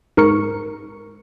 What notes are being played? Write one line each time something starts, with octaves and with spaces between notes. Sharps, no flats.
G#2 A#4 C#6 C#7